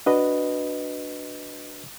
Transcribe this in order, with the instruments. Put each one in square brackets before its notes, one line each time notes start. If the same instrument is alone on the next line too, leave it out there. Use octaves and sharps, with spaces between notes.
[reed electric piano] D4 F#4 B4 D#5